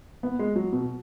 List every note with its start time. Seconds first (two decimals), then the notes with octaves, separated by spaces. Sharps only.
0.23 B3
0.39 G#3
0.56 F#3
0.73 B2